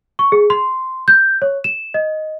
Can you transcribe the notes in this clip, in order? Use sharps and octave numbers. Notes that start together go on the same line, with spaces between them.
C#6
G#4
C6
G6
C#5
E7
D#5